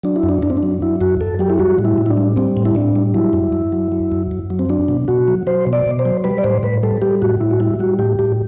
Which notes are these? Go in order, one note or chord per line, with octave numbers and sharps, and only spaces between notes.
F#3 D4
E4
F#2
D4
F#2 D4
C4
D4
F#3
F#3 E4
F#2 F#4
F#2 A4
F#3 G4
E4
G3 F#4
A2
E4
A2
E4
D4
G3
G3 C4
A2
E4
A2 D4
G3
F#3 E4
F#2
F#2
F#3
F#3
F#2
F#2
F#3
C4
F#3 D4
B2
B2 F#4
F#3
F#3 C5
B2
D5
B2
C5
F#3
G3 B4
D5
A2 C5
A2 B4
G3 A4
G3 G4
A2 F#4
A2 E4
F#4
G3 E4
G3 F#4
A2 G4
A2 G4